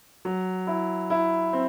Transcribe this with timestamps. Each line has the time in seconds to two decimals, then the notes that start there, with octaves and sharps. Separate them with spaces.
0.25 F#3
0.67 E4
1.10 E4
1.53 C4